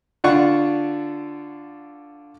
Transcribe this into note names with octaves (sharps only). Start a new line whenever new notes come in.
D3 D4 F4 F#5 C#6